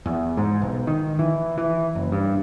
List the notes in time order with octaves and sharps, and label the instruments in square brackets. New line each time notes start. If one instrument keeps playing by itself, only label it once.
[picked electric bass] E2
G#2
B1
D#3
E3
E3
F#1
G2